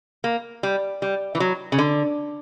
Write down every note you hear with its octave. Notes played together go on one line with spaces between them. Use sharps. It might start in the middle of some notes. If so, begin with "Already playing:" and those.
A#3
G3
G3
E3
F#3
C#3
D3